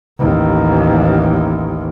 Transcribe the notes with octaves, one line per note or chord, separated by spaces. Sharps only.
A1 D#2